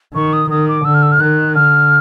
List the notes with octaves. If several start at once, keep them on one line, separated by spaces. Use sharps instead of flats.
D#3 C#6
D#6
D#3 D#6
D6
D3 E6
F6
E6
F6
D#3 F#6
D3 F6